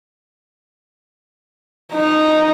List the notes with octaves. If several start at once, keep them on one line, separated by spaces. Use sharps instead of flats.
D#4 A#5